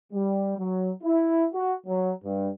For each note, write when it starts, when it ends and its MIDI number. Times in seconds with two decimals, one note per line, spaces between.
0.13 0.57 55
0.58 0.92 54
1.04 1.46 64
1.55 1.74 66
1.87 2.12 54
2.24 2.50 43